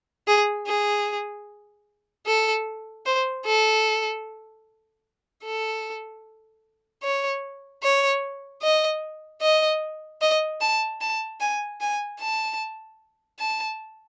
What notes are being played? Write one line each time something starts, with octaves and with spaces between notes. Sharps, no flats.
G#4
G#4
A4
C5
A4
A4
C#5
C#5
D#5
D#5
D#5
A5
A5
G#5
G#5
A5
A5